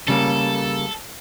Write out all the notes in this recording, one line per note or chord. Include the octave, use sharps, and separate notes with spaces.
C#3 G3 A#3 A4